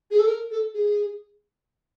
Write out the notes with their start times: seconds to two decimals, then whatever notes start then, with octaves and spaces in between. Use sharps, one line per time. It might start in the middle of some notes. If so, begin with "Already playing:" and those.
0.11 G#4
0.19 A4
0.27 A#4
0.51 A4
0.74 G#4